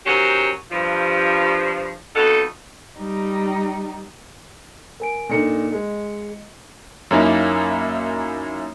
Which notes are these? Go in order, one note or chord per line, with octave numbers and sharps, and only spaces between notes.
D#3 F#3 C#4 F#4 G4 C5
G2 F3
F2 B3 D#4 F#4 A4 F#5
G3 D#4
A#4 G#5 D7
A#2 D4 D#4 A4 C#7
G#3 D#5
F#2 A#3 C#4 D#4 E4